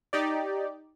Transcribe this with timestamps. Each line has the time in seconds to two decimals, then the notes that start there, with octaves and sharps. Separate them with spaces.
0.13 D#4 G4 D5